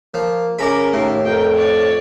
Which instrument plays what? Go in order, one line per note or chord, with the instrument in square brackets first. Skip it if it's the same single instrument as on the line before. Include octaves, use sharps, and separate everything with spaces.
[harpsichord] F3 [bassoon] A#3
[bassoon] C#3 [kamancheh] C#4 A#4 [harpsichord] D5 A#5 B5
[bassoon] D#2 [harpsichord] A2
[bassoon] F2 [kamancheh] A#4 G5
[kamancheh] C#5 D5